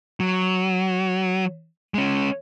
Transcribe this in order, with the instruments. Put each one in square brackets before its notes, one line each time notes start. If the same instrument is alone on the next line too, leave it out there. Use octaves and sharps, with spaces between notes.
[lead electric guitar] F#3
G#3 C#4